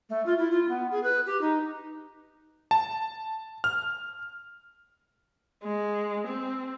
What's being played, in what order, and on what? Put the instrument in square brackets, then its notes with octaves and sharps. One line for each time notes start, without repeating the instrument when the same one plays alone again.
[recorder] A3
F4
E4
F4
B3
G#4
B4
G4
D#4
[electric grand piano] A5
F6
[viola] G#3
C4